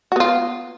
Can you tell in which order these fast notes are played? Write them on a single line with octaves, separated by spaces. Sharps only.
F#4 B3 F4